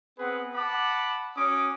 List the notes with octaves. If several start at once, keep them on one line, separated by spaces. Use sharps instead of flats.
B3 C4 G#4 B4 F#5
F#5 A5 B5 D6
C#4 F#4 D6 D#6